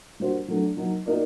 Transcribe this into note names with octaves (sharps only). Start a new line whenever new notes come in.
G3 A#3 D4 F#4 C5
F#3 A3 D4
F#3 A#3 D#4
A#3 D#4 F#4 A#4 D5